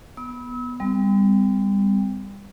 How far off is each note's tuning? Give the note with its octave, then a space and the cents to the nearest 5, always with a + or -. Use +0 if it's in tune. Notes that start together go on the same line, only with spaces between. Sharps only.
B3 -15 E6 -40
G3 +25 C4 -45